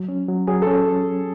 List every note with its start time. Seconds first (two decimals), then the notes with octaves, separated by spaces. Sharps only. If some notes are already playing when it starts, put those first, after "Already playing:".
Already playing: F#3
0.09 C#4
0.28 F#3
0.47 F#3 G#4
0.62 C#4 A4